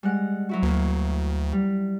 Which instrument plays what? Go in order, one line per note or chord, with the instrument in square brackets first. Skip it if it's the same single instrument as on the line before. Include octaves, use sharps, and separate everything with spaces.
[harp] G3 G#3 F#5
F#3 E4 F#4
[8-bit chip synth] D2 [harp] A#3
[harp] G3